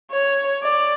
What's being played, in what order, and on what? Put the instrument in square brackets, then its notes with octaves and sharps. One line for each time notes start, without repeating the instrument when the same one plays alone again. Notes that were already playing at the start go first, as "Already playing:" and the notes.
[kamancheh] C#5
D5